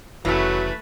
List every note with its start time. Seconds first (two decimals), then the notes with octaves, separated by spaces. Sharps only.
0.25 F1 C#3 E3 F#3 A3 E4 B4